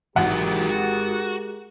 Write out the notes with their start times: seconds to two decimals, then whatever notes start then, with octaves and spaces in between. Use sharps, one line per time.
0.16 G#1 E3 F#3 G#3 G4 A#4 F#5
0.69 F#4